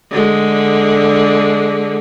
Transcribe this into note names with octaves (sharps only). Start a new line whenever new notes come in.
D3 G#3